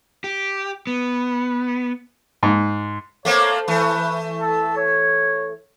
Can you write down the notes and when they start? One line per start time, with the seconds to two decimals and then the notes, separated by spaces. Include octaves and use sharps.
0.24 G4
0.87 B3
2.43 G#2
3.25 A3 A#3 C4 C#5
3.68 E3 A3 B4
4.40 A4
4.77 C#5